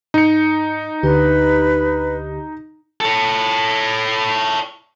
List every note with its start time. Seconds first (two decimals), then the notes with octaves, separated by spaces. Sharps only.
0.14 G#2 D#4 C#7
1.03 D2 D3 G4 B4
3.00 A4 C#5